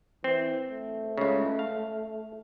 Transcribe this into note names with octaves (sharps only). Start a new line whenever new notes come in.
E3 C4
A3
C#2 C#3
F5